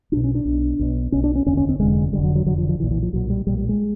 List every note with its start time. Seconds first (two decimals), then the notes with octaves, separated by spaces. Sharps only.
0.12 B1 B2 D4
0.24 C#4
0.35 D4
0.45 B1 B2
0.79 B1 B2
1.12 B1 B2 C#4
1.24 D4
1.35 C#4
1.46 F1 D#2 D3 C#4
1.57 C#4
1.69 C4
1.80 F1 D#2 D3 G#3
2.13 F1 D#2 D3 G3
2.24 F#3
2.35 F#3
2.46 F1 D#2 D3 F#3
2.58 F3
2.69 F3
2.80 B1 A#2 E3
2.91 E3
3.02 F3
3.13 B1 A#2 F#3
3.30 G3
3.47 B1 A#2 G3
3.58 G3
3.69 G#3